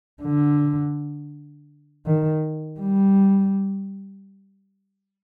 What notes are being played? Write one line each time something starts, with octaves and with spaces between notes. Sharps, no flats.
D3
D#3
G3